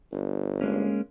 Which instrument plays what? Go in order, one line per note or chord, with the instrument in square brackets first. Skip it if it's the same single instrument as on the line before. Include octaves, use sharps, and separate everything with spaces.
[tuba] G1
[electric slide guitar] G#3 A#3 C#4